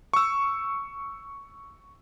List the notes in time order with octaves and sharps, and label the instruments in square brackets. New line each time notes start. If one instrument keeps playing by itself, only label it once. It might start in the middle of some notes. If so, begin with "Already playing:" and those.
[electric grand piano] C#6 E6